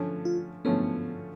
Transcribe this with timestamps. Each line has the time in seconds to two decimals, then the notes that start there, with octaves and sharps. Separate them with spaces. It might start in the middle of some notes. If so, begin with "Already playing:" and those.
Already playing: D3 F3 A3 C#4
0.25 F4
0.65 D3 F3 A3 B3 C#4